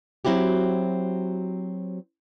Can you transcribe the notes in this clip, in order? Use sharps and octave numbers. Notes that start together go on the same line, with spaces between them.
F#3 C4 E4 F#4 G4